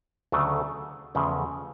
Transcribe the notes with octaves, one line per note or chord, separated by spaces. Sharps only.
D2 C#3 F#3 A3 D4
E2 C#3 F3 A3 C#4